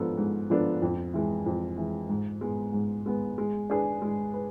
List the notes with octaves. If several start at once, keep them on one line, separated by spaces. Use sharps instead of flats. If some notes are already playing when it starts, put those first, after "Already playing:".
Already playing: G#2 F3 B3 D4 A4
G#2
F3 B3 D4 A4
F2
E3 G#3
F2
E3 G#3
G#2
G#3 B3
G#2
G#3 B3
G#3
D4 G#4 B4
G#3
B4